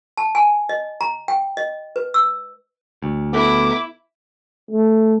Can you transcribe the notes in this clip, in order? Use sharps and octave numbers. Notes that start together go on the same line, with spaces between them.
A5
G#5
D#5
A#5
G5
D#5
B4
E6
D2
B3 E4 A4 B4 D6
A3